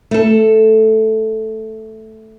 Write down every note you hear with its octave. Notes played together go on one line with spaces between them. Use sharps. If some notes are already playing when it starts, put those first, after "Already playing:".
A3 A4